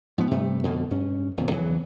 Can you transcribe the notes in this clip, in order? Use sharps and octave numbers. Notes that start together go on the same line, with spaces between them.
G#2 F3 B3
G2 C3 G3 A3
F2 B2 D3
G2 C#4
D1 G#1 F2 B2
E2 C#3 E3 F#3